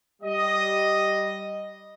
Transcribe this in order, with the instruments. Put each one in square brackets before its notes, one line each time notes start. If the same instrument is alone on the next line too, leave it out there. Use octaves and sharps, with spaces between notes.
[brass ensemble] G3 D#5